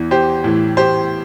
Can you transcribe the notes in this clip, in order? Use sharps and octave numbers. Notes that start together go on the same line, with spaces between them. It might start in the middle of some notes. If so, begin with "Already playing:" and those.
Already playing: E2 E3
G4 C5
A2 E3
G4 C5